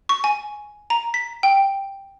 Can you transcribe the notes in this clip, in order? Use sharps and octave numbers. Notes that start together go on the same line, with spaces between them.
C#6
G#5
A#5
B6
G5